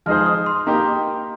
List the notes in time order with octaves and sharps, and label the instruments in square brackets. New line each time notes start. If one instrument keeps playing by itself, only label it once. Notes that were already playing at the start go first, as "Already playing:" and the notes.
[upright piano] F3 G#3 D#4 G#4 C5 [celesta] F6
[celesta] F6
D#6
C6
[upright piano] A#3 D#4 G4 [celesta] A#5